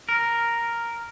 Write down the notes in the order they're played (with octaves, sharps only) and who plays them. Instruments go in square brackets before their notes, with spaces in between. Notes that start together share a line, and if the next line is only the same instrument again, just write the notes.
[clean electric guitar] A#4